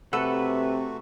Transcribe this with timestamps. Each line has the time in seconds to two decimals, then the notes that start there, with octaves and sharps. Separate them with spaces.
0.13 C3 A3 F#4 A4 B4 F#5